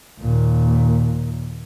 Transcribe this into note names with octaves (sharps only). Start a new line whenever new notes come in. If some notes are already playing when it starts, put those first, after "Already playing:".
D#2 A#2